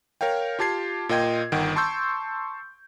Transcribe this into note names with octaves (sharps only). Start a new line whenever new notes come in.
A#4 C#5 F5 G5
F4 G4 A5 G#6 C7
A#2 F4 A#4 D#5 G5 G#6
G1 D#3 F#5 G5 D7
A5 C6 C#6 E6 G6